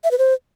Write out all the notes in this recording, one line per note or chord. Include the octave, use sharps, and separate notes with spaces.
E5
B4
C5